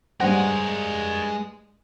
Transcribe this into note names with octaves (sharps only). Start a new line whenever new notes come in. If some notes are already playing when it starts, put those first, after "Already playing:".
G2 G#3 G#4 A#4 C5 C#5 F#5